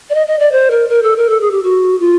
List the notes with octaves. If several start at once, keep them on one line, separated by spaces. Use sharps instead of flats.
D5
D#5
D#5
D5
C5
A#4
A#4
A4
A#4
A4
G#4
G4
F#4
F4